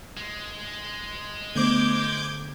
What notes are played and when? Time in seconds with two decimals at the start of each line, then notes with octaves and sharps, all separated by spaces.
0.17 G#3
1.55 D3 A3 B3 C5 D6 G6 G#6